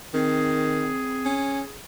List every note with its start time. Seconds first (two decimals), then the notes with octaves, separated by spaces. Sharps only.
0.14 D#3 C4 G#4
1.25 C#4